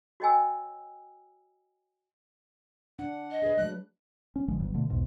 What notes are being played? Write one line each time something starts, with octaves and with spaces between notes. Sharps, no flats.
F#4 C#5 D#5 G5 G#5 E6
D4 F#5
D#5
D4 G#4 B4
F#3 G#3 A3 F#6
C#4
A1 D3 F3 G#3
D1 G1 G2 F#3
B2 D3 A3
B1 E2 G#2 B2